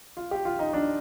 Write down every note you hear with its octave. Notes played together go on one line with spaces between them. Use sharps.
F4
G4
F4
D#4
D4